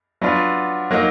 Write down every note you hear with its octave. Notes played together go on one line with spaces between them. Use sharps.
F#3 B3 D4 F4
F#3 A#3 D#4